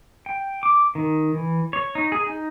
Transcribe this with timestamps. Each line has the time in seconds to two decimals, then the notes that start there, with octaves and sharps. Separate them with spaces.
0.26 G5
0.63 D6
0.95 D#3
1.34 E3
1.73 C#5
1.95 D#4
2.12 G#4
2.27 D#4